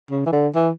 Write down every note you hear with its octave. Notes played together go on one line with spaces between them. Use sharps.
C#3
E3
D3
E3